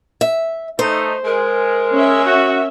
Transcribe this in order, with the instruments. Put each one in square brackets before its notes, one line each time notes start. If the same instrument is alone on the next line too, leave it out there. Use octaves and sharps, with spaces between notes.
[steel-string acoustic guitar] E5
[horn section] A3 D#4 A4 [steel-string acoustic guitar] C5
[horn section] G#3 [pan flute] A#4
[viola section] C#4 E5
[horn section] F#4